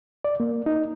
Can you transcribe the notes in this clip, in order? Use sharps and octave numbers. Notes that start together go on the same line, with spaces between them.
D5
A#3
D#4